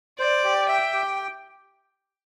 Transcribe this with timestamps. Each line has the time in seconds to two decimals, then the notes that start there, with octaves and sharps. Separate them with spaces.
0.19 C5 D5
0.44 G4
0.68 E5 G5
0.93 G4